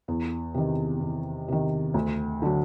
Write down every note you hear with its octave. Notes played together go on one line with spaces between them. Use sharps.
E2
C3 D#3
E2
C3 D#3
D2
D3 F#3